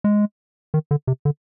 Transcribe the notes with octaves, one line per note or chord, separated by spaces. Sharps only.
G#3
D#3
D3
C3
D3